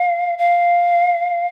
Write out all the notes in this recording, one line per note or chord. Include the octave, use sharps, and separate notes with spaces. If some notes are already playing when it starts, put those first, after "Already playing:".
Already playing: F5
F5